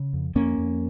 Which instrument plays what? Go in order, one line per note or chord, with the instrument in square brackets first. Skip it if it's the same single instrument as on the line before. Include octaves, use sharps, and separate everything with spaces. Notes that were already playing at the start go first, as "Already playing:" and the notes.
Already playing: [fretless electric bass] C#3
F2
F2 A#3 C#4
F2